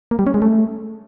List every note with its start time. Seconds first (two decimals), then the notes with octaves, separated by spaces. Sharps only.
0.11 A#3
0.19 G3
0.27 C#4
0.34 G#3
0.42 A3